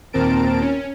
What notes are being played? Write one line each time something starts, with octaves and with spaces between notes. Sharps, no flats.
D#2 A#2 C4 A#4 A5 D7
C#4